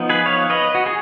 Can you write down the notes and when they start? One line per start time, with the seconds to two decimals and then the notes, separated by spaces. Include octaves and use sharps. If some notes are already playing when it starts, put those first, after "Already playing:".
Already playing: F3 B3 D#4
0.10 G#4 B4
0.26 C#5 F5
0.50 B4 D#5
0.75 F#4
0.86 G#4